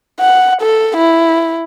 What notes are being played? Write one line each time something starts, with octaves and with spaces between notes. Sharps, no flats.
F#5
A4
E4